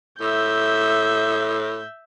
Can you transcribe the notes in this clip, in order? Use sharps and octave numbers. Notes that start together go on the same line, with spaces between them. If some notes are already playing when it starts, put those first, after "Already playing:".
A2 E5 G6